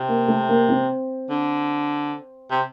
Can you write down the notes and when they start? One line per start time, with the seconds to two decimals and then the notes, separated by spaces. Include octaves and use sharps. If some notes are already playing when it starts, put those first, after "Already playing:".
Already playing: C3
0.09 A#3
0.28 A3
0.49 A#3
0.69 C4
1.30 D3
2.51 C3